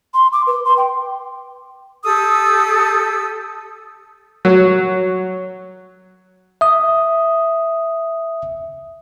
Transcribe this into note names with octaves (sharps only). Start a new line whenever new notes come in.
C6
D6
B4
C6
G5
G4 A4 D#6 E6
F#3
E5 D#6